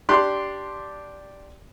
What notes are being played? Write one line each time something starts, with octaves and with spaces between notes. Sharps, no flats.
D4 G4 C6 F#6